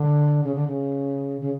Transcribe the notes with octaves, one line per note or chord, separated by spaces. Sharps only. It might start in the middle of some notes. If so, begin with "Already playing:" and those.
Already playing: D3
C#3
D3
C#3
C#3